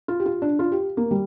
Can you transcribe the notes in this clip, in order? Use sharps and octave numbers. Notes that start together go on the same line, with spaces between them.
F4
G4
F4
D4
F4
G4
A#3
G3